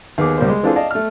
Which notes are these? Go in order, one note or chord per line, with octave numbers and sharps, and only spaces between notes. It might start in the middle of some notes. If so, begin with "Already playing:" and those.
D#2 B3 G#4 D6
C#2 G3 A#3 C5
G#3
E3 C4 D4 F4 G#4 A4
D5 D#5 F5 A5
A3 F6